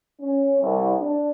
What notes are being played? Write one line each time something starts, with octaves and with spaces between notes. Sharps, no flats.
C#4
C2
D4